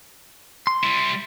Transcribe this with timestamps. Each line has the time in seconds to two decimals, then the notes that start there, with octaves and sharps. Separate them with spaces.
0.67 C6
0.83 G3 E4